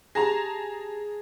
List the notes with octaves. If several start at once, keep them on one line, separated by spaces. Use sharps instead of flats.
G4 G#4 A5 A#5 A#6